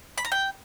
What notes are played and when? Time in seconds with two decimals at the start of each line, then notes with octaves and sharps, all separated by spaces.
0.18 B5
0.25 A#5
0.32 G5